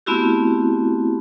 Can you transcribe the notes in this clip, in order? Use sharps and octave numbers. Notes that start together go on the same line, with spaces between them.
A3 B3 C4 E4 F#4 G4